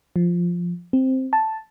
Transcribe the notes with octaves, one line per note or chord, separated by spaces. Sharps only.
F3
C4
A5